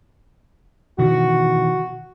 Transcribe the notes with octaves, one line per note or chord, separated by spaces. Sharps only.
B2 D#3 E3 F#4